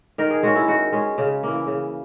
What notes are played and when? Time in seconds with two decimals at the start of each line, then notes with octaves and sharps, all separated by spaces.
0.18 D#3 A#4
0.30 G#4
0.43 G#3 C#4 F#4
0.55 E4
0.68 D#3 F#4
0.92 G#3 C#4
1.18 C#3
1.43 E3 A#3
1.67 C#3